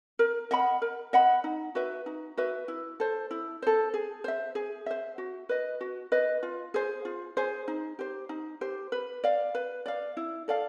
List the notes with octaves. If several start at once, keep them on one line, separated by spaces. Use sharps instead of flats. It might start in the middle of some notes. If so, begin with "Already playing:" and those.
A#4
D#5 F#5 B5
A#4
D#5 F#5 B5
D#4
F#4 B4 E5
D#4
F#4 B4 E5
E4
A4 C5
E4
A4 C5
G#4
C5 E5
G#4
C5 E5
F#4
B4 D#5
F#4
B4 D#5
F4
G#4 C5
F4
G#4 C5
D#4
G4 C5
D#4
G4 C5
B4
D5 F5
B4
D5 F5
E4
A4 D5 F5